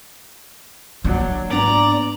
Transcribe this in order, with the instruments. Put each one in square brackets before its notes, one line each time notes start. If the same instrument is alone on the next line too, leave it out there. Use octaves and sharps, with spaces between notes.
[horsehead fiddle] F#3 D4 [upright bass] A#3
[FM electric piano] G#2 B3 D4 [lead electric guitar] D5 [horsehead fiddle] A#5